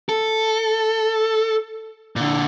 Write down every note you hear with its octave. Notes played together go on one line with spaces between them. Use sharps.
A4
A#2 D3